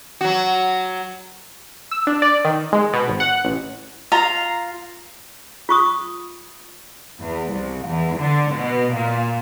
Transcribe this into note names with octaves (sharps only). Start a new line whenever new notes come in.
F#3 F#4
E6
D4
D5
D#3
G#3
B2
G#1
F#5
A1
F4 F5 A#5
F4 C#6 D#6
E2
C2
E2
D3
B2
A#2